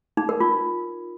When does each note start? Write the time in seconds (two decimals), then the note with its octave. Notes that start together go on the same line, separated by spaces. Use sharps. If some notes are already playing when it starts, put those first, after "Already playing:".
0.17 D#4
0.29 A#4
0.40 F4